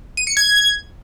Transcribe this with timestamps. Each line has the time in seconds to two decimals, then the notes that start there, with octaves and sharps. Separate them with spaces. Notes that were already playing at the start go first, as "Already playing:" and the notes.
0.17 D#7
0.27 C#7
0.37 G#6